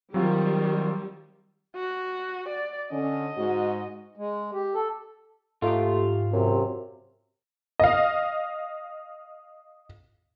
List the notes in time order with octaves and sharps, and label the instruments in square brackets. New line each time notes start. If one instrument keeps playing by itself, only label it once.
[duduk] D#3 [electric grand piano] F#3 C4 F4 [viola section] G3
[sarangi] F#4
D5
[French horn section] D3 C#4 [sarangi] D#5
[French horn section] G#2 G#3 F#4
[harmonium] G#3
G4
A4
[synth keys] G#2 G4 [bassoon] A3 [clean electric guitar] F4
[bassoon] F#2 [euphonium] C3
[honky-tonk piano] D#5 F5